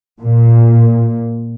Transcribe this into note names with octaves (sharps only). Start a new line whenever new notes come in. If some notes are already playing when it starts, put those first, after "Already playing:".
A#2